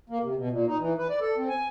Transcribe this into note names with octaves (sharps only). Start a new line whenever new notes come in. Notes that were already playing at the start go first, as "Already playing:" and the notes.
A#3
C3
B2
A#2
D#4
E3
B4
D5
A4
C4
G#5